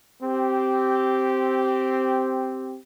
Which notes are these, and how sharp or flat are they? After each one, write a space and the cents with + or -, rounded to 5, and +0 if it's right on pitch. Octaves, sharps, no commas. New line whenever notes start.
C4 +0 G4 -10